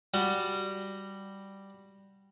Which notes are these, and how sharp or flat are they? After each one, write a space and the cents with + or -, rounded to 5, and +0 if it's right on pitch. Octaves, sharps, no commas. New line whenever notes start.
G3 +0 F#4 +0